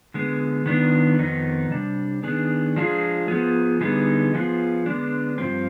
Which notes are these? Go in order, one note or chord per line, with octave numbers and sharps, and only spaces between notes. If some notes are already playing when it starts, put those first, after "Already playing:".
D3 G#3 B3
D#3 B3 D4
F2 D#3 B3 D#4
C3 G3 D4
D#3 B3 D4 G#4
F3 G#3 D4 F4 G#4
F3 B3 F4 G#4
D3 G3 B3 D#4 G#4
F3 B3 F4 G#4
D3 G#3 B3 D4
G2 F3 C4